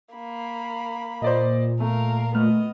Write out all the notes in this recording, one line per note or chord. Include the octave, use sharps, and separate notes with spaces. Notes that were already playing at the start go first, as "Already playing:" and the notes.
A#3 B5
A#2 C5 D5 D#5
A3 A#4 F5
A3 B3 D#5 F6